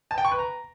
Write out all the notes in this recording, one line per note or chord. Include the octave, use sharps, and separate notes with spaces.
A5
G5
C#6
B4
A#5